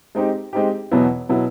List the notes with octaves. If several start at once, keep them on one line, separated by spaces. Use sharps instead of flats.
G#3 C4 D#4 G4
G#3 C4 D#4 G4
E2 B2 F#3 B3 E4
B2 F#3 B3 E4